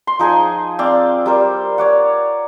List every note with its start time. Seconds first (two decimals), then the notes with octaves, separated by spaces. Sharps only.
0.07 C6
0.19 F3 D#4 G#4 G#5
0.79 C4 D5 F5
1.26 G3 A#4 C5
1.78 C#5 D5 F#5